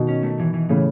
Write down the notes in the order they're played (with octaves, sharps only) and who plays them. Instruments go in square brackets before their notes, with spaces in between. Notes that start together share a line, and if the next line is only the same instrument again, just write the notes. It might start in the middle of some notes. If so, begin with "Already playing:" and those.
Already playing: [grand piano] B2 D#3
[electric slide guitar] C#4
A3
E3
E3
[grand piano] A2 C#3 [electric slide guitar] E3